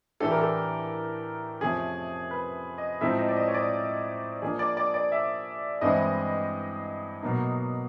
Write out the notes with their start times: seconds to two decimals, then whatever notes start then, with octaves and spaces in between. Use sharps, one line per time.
0.20 A2 E3 A3 D4 G4 A4
0.31 A#4
0.41 A4
1.61 F2 C3 F3 A3 C#4 G#4
2.31 B4
2.78 D#5
3.01 A2 F3 G#3 C4 D#4 E5
3.18 D#5
3.28 D5
3.36 D#5
3.48 C#5
3.54 D5
4.42 F3 A#3 D4 G#4
4.59 D5
4.77 D5
4.94 D5
5.12 E5
5.81 G2 E3 G#3 C4 E4 D#5
7.23 B2 F#3 A#3 D#4